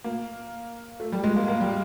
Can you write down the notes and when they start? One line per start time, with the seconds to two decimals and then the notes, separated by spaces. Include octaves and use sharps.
0.04 A#3
1.00 A3
1.12 G3
1.24 G#3
1.36 A#3
1.48 A#3
1.60 G3